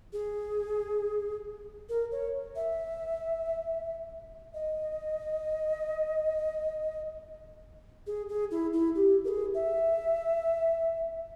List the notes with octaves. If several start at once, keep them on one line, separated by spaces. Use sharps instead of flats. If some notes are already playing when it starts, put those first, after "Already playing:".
G#4
A#4
C#5
E5
D#5
G#4
G#4
E4
E4
G4
A#4
G#4
E5